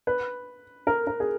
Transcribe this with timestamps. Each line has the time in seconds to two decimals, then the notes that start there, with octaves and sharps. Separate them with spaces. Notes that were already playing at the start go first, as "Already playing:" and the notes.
0.07 B4
0.87 A#4
1.07 A#4
1.20 G#4